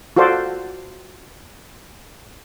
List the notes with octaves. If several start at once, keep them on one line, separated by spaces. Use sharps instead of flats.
F4 F#4 A4 C5 D5